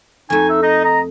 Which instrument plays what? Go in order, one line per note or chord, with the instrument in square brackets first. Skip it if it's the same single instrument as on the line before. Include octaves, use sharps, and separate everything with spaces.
[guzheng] F2 A3 [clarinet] D#4 [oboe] G#5
[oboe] E5
[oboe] D#4 [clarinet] D#5
[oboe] D#5 [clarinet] A#5